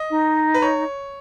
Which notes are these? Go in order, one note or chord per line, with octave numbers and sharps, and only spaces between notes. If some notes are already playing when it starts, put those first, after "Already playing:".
Already playing: D#5
D#4
B4
C#5